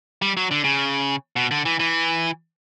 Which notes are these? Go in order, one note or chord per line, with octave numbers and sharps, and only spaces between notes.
G3
F#3
D3
C#3
B2
D3
E3
E3